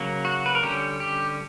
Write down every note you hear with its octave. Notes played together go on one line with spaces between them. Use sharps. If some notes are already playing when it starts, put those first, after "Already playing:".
Already playing: C#3 F#3 A#3
F#4
B4
A#4
D3 G3 C#4 G4
G4